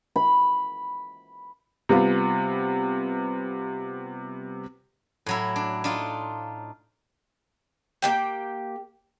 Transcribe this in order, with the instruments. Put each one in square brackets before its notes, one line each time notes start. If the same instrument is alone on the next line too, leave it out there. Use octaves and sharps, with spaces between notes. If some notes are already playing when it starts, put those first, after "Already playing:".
[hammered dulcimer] B5
[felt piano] C3 G3 B3 F4
[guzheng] A2 F#3 E4
D4
D4 D#4 F4
[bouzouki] A#3 G4 G5